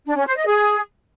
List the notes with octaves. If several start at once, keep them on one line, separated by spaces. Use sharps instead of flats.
D4
C#4
C5
D#5
G#4